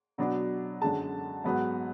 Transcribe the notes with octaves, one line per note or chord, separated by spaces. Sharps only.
B2 F#3 B3 D4
F#2 D3 G#3 A5
G#2 F#3 B3